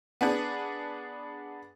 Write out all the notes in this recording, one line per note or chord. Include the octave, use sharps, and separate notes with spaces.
B3 D4 G#4